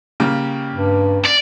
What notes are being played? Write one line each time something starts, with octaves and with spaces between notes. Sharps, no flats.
C#3 G3 A#3
G2
D5